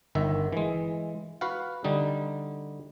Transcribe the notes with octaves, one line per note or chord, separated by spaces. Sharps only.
G1 D#3 E5
E3 G#3
F#4 B4 F5 F#5
D3 G3 D#4